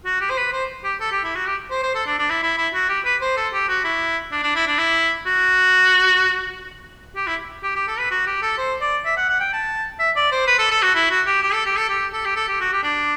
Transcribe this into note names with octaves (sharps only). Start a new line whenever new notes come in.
F#4
G4
C5
B4
C5
G4
A4
G4
E4
F#4
G4
C5
C5
A4
D4
D4
E4
E4
E4
F#4
G4
B4
C5
A4
G4
F#4
E4
D4
D4
E4
D4
E4
F#4
G4
E4
G4
G4
A4
B4
F#4
G4
A4
C5
D5
E5
F#5
F#5
G5
A5
E5
D5
C5
B4
A4
A4
F#4
E4
F#4
G4
G4
A4
G4
A4
G4
A4
G4
A4
G4
F#4
G4
D4